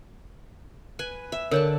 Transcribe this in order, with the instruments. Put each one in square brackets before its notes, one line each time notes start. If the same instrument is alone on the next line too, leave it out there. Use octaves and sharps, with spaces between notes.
[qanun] B4 G#5
E5
[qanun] D3 D4 A5 [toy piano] A#4 C#5